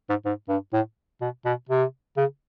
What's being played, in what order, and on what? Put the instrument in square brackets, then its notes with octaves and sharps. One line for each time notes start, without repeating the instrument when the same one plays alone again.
[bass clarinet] G#2
G#2
G2
A2
B2
B2
C3
C#3